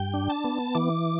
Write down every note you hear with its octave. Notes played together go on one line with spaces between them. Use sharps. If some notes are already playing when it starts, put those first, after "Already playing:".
Already playing: G2 G5
D4
A5
B3
E3 D6